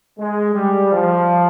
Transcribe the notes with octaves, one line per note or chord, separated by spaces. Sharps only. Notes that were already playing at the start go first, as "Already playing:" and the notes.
G#3
G3
F3